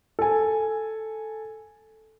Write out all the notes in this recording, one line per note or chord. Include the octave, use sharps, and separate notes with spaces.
A4 G#5